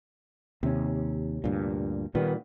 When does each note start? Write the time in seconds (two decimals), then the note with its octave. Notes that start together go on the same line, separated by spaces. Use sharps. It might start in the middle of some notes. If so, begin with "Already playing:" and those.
0.63 D#2 C3 C#4
1.44 D2 G2 A#2
2.15 A#2 D#3 G3 A#3 B3